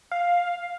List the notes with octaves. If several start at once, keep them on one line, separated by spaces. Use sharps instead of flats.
F5